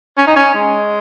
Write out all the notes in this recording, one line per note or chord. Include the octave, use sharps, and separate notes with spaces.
C#4
D#4
C#4
G#3